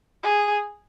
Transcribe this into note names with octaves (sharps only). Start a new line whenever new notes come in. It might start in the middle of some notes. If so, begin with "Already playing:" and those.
G#4